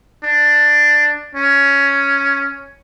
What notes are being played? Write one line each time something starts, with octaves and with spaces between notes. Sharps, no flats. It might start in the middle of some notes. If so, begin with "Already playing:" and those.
D4
C#4